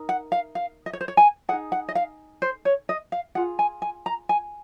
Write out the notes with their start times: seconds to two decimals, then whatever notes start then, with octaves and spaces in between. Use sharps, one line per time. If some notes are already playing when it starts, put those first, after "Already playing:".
Already playing: D#4 A#4
0.09 F#5
0.32 F5
0.55 F5
0.86 D#5
0.93 C#5
1.01 C5
1.08 C#5
1.17 G#5
1.49 G#4 F#5
1.53 D#4
1.72 F#5
1.89 D#5
1.95 F5
2.42 C5
2.65 C#5
2.89 D#5
3.12 F5
3.35 F4 G#4 F#5
3.59 G#5
3.82 G#5
4.06 A#5
4.29 G#5